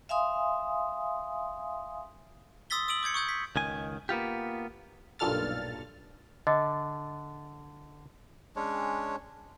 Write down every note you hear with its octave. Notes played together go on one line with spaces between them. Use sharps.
E5 F5 G#5 C6 D#6
C6 D#6 E6 A6 B6 G7
D#6 E6 D7 F#7
D6 G6 G#6 C#7
C#6 D#6 G6 G#6
B6
C#2 D#3 G#5
A#3 B3 F4 G4
B1 G2 A#2 A4 F6 A6
D3 D#5
G#3 C#4 D4 C#5